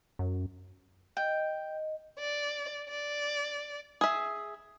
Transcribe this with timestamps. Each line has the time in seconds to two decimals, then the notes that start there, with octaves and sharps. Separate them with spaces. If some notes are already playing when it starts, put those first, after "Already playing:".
0.19 F#2
1.17 D#5 G5
2.19 D5
2.89 D5
4.01 G#4 E5